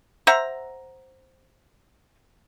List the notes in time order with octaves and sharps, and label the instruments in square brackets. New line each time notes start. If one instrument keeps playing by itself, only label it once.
[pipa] C5 E5 F#5 A#5